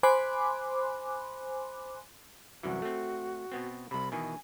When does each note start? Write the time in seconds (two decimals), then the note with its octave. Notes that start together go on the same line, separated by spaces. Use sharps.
0.03 C5 G#5 B5 C6 D6 F#6
2.63 C2 F#2 E3 F#4
2.82 A3 C4
3.52 B2 B3 C4
3.91 C2 C3 B5
4.12 B2 D#3 E3 G#5